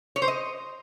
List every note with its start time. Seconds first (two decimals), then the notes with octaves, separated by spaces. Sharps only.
0.16 C#5
0.22 C5
0.28 D#5